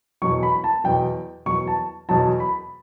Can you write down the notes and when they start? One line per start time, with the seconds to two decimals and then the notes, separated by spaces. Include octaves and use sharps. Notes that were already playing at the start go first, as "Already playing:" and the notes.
0.22 E2 B2 F#3 C#6
0.43 B5
0.64 A5
0.84 E2 B2 F#3 G5
1.46 E2 B2 F#3 C#6
1.68 A5
2.09 E2 B2 F#3 A5
2.40 B5